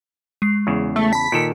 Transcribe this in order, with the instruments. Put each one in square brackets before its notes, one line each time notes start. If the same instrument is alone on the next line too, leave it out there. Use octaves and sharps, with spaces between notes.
[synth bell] G#3 C7
[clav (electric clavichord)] E2 C#3
[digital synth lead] A3
[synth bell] A5 B5 [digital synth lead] B6
[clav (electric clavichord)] A#2 D#3 A4 [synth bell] C#7 D7